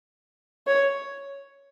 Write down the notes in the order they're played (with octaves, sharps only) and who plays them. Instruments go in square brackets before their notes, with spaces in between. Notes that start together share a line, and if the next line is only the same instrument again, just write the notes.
[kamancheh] C#5